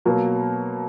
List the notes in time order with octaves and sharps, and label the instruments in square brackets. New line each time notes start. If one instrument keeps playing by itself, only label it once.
[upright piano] B2 F#3 A#3